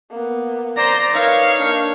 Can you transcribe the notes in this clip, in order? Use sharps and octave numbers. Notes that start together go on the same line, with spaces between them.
A#3 B3
C5 D5 A#5
D#4 A#4 B4 C#5 F5
A#3 D4